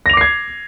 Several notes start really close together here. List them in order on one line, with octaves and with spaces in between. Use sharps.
A#6 F7 D6 C7 G#6